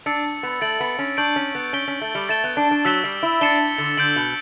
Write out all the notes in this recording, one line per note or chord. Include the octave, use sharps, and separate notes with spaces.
D4 E6 A6 C#7
B3
A3 A6 D7 F#7
B3
C#4
D4 C#6 G6 D7 F#7
C#4
B3
C#4 G6 D7 G7
C#4
A3
G3
A3 A6 E7 G7
B3
D4
D4
F#3 E6 B6 E7 G7
G3
E4
D4 A6 C#7 E7 G7
D3
D3 G6 D7 F#7
B2